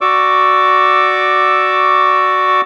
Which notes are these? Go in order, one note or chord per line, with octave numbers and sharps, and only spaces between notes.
F#4 D5 C#6 D6 E6